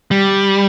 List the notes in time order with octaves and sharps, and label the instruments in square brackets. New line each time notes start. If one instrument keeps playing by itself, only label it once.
[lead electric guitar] G3